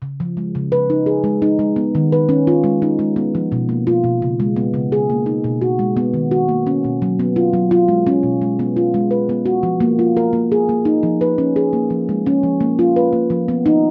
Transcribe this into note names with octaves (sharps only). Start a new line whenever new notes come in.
C#3
F3
G#3
C#3
B4
D#4
G#4
G#3
D#4
G#3
B3
D#3
B4
C#4
F4
G#3
D#4
G#3
B3
F3
B2
A#3
F4
B2
C#3
G#3
B3
C#3
G#4
A#3
D#4
B2
F#4
G#3
B3
D#3
F#4
A#3
C#4
B2
F#3
B3
F4
F#3
F4
G#3
C#4
B2
G#3
B3
F4
G#3
B4
B3
F#4
F3
A#3
F4
A#4
A#3
G#4
A#3
D#4
F3
B4
C#4
G#4
A#3
F3
G#3
C#4
F3
A#3
F4
B4
A#3
F3
B3
D#4